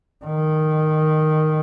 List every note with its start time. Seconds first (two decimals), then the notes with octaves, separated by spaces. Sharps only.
0.25 D#3